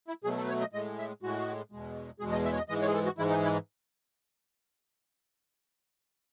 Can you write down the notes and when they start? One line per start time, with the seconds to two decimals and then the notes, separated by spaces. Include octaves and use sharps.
0.08 E4
0.24 B2 F#3 A3 G#4
0.37 A4
0.44 B4
0.49 C#5
0.61 D#5
0.73 A2 G#3 D#5
0.98 E5
1.22 A2 G#3 F#4
1.72 E2 B2 G#3
2.20 E2 B2 G#3 G#4
2.32 D#5
2.45 E5
2.53 C#5
2.57 D#5
2.69 G#2 E3 G#3 D#5
2.82 C#5
2.87 G#4
2.94 A4
3.06 F#4
3.18 G#2 E3 G#3 E4
3.30 D#4
3.43 E4